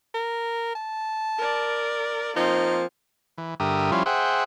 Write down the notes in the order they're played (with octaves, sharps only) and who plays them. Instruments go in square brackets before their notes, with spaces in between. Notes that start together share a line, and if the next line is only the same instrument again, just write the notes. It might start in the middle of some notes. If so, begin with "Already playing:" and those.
[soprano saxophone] A#4
A5
[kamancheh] A#4 D5
[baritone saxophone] F3 [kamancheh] A#3 C4 [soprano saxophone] D#4
[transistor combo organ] E3
G2 D3 G4 A#4 E5 D#6
F3 G3 C#4 E4 F4
G#4 C5 E5 F#5 G5